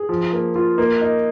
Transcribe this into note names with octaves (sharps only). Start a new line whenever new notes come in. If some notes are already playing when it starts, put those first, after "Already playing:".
Already playing: G#4
F3
A#3
F4
A#3
D#4